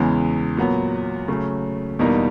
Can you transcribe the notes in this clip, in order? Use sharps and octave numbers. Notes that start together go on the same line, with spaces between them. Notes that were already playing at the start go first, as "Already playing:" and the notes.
Already playing: E2 C#3 E3 G#3 B3
A#2 F#3 B3
C#3 F#3 A3
E2 B2 G3 A#3 D#4